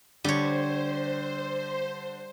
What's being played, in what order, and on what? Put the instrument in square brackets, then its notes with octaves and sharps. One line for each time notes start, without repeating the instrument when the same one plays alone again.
[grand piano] D3 [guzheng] G3 C#5 [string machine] C5